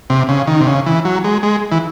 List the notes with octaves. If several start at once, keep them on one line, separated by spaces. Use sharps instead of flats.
C3
C#3
D#3
C3
C#3
E3
F#3
G#3
G#3
E3